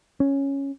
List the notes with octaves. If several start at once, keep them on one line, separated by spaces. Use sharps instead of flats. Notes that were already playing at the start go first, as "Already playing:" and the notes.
C#4